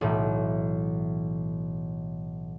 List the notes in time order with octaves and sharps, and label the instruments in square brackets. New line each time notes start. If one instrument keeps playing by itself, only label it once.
[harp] B1 A2 E3